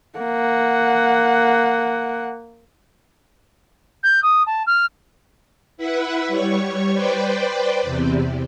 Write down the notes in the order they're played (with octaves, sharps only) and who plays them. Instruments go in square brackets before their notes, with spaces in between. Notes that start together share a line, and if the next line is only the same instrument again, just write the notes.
[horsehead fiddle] A#3 F#5
[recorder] G6
D#6
A5
F6
[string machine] E4 B4 E5 F#5
G3 C#5 C#6
B4 C5 D5 G5
E2 C3